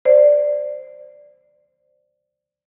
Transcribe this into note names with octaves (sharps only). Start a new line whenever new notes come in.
C5 D5